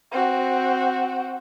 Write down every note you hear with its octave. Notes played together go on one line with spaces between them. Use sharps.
C4 F#4